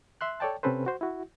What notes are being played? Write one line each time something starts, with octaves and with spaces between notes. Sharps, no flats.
E5 C6 F#6
A4 C#5 D5 G5 A5
C3 C4 C#4 A4 B4 C5
F#4 C5
E4 F#4